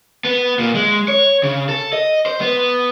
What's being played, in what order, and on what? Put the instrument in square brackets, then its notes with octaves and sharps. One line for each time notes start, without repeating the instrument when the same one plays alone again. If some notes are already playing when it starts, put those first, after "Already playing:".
[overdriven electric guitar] B3
A#2
G#3
C#5
C#3
A4
D#5
C5
B3